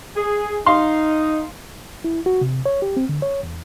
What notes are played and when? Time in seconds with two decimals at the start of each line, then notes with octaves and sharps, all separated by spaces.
0.16 G#4
0.66 D#4 F5 C6
2.04 E4
2.26 F#4
2.41 C3
2.66 C#5
2.82 G4
2.97 C4
3.09 D3
3.22 C#5
3.43 E2